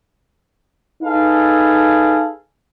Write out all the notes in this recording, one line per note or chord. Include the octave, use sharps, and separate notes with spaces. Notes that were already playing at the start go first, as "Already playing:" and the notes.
D#4 G#4 A4 B4 F5